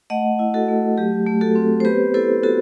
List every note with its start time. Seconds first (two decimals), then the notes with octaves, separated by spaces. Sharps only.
0.10 A3 D#5 F#5
0.39 E4
0.54 F#4 A4
0.68 A3
0.98 F#3 G4
1.27 A3
1.41 F#4 A4
1.55 C4
1.80 C5
1.85 B3 G4 B4
2.14 E4 A4 C5
2.43 B3 F#4 A4